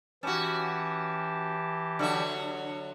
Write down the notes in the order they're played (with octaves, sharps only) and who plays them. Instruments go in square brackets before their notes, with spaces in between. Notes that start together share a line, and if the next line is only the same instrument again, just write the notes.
[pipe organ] E3 G4 A5 [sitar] C#4 F#4
[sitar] D3 F#3 E5